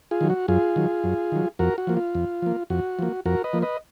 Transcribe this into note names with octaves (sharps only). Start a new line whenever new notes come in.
F4 G#4
D#3 F#3
F#4
F#2 F4 G#4
D#3 F#3
F#2
D#3 F#3
F2 F#4 A#4
F#4
F3 A#3
F4
F2
F3 A#3
F2 F#4
F3 A#3
F2 F#4 A#4
B4 D#5
F3 A#3
B4 D#5